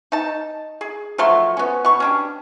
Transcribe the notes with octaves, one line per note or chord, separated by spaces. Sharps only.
D#4 A5
G#4
F3 F#3 A3 C6
B3 C#4
B2 C#6
C#4 D4 G4